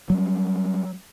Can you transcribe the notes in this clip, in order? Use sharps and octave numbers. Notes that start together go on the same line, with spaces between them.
F#3 G3 C#4